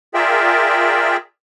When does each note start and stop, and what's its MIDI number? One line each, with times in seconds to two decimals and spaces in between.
0.14 1.17 65
0.14 1.17 68
0.14 1.17 70
0.14 1.17 74
0.14 1.17 76
0.14 1.17 79